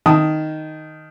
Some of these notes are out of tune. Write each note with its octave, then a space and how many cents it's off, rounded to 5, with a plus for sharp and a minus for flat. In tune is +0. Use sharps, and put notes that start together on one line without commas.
D#3 +0 A5 -10 D#6 +0